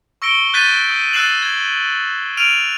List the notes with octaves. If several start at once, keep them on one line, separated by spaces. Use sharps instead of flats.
C#6 E6 A#6 C#7 D7 G7
F#6 G6 A6 B6 D#7
D#6
E6 F#6 A6 C7 E7 F#7
G#6
F6 D7 D#7 F7